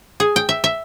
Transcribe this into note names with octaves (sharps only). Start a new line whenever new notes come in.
G#4
G5
E5
E5